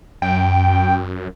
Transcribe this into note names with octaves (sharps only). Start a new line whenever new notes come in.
F#2 G5